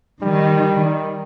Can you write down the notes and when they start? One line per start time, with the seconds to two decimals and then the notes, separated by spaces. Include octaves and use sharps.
0.22 D#3 G3
0.85 D#3